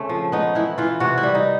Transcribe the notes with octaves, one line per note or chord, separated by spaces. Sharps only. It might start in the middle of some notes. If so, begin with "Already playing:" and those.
Already playing: C#3 A3 C4 C#4
F3
B3 D#4
E3 E4
E3 F4
C3 F#4
E4
G3
D#4